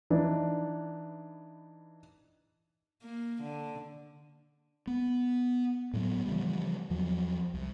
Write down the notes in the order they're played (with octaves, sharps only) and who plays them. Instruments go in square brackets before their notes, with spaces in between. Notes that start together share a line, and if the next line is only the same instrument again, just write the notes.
[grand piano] E3 D4 D#4 B4
[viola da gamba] A#3
D3
[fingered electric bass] B3
A2 F#3 B3
C#3 E3 F3 G3
E2 F3 F#3
C2